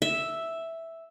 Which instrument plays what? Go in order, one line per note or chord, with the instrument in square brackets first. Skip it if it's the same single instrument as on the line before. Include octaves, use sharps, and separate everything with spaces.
[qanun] E5